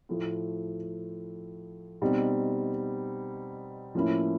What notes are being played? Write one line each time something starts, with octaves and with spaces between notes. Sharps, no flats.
A2 F3 A3
B2 G3 C4 D#4
A2 F3 A#3 C#4 E4